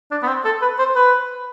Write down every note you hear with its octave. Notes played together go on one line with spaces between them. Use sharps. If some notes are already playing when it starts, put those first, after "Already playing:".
D4
B3
C4
A4
B4
C5
B4